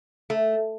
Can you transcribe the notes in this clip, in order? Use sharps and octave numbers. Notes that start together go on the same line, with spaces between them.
A3